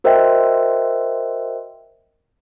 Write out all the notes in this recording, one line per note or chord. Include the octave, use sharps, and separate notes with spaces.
F#4 A#4 C5 D#5 E5 G5